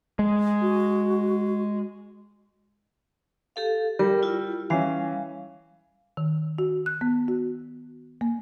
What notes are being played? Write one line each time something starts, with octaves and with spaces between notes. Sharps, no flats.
G#3
F#4
G4 A4 F5
G3 A#4
E4 F4
E3 G3 C#4 F5
D#3
F#4
F#6
B3
F#4
A#3